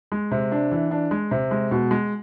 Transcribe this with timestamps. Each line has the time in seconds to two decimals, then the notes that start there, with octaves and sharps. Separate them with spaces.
0.12 G#3
0.31 C3
0.52 D4
0.72 E3
0.91 D4
1.11 G#3
1.31 C3
1.51 G#3
1.71 B2
1.91 G#3